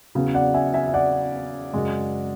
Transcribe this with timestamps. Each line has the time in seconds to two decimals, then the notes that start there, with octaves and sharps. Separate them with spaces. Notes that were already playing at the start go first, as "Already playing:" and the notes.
0.15 E2 C#3 F#3
0.34 D5 F#5
0.54 E5 G#5
0.74 E5 G#5
0.87 E5
0.94 D5 F#5
1.73 F#2 C#3 G#3